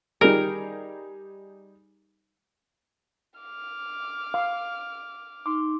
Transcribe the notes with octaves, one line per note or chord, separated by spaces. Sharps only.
G3 D#4 G#4 A#4
D6 F6
F5
D#4 C6 D6